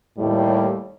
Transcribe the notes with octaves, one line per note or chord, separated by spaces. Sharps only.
D#2 A2 G3